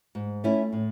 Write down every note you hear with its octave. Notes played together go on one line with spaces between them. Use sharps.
G#2
A3 C#4 E4
A2